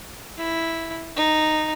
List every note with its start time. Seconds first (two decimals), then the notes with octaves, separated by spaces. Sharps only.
0.38 E4
1.16 D#4